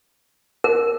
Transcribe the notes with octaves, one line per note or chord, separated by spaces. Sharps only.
A#4